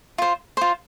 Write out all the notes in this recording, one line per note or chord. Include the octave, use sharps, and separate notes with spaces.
F4 C5
F4 C5